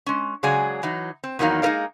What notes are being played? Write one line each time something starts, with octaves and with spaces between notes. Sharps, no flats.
G#3 C#4
C#3 F#3 G#3 G#4 D5 G#5
E3 F#3 D#4
C4
E2 D#3 F#3 A#3 D#4 F5
G#3 A#3 D#4 A#4 D5 F5